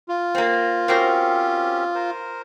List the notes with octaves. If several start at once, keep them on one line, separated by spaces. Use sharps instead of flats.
F4
A#3 C4
C4 C#4 F#4 G4 A#4 C5
A#4 C5